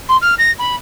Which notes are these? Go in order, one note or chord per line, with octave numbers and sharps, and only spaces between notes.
C6
F6
A#6
B5